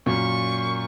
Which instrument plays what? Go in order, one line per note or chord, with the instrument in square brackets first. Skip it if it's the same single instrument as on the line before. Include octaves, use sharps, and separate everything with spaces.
[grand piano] F#2 A#2 [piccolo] C#6